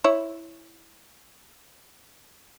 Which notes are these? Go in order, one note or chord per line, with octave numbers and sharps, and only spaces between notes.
E4 C#5